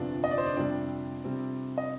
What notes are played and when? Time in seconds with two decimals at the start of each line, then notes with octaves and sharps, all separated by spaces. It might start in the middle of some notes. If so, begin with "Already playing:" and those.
Already playing: G1 F2 C3 F3 B3 D4 D5
0.24 D#5
0.31 D5
0.38 C5
0.45 D4 D5
0.57 F2 C3 G3 C4 D4 D5
1.24 F2 C3 G3 C4
1.78 D#5